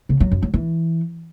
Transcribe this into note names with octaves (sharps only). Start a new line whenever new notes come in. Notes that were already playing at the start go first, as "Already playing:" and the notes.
C#3
F#3
F#2
F#3
E3